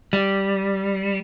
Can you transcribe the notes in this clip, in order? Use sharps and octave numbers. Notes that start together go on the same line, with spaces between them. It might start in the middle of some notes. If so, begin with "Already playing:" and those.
G3